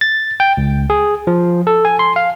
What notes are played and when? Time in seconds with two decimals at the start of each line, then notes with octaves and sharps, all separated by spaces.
0.01 A6
0.40 G5
0.57 C#2
0.90 G#4
1.27 F3
1.67 A4
1.85 G#5
1.99 C6
2.16 F5